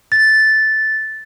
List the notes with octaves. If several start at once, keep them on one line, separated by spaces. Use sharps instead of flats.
A6